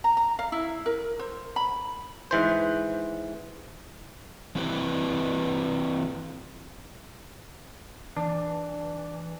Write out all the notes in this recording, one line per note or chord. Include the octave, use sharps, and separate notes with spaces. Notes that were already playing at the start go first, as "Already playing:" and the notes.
A#5
A#5
F5
E4
A#4
C5
B5
G#2 E3 C5
E3 C4 E4 G4 B4
E3 D4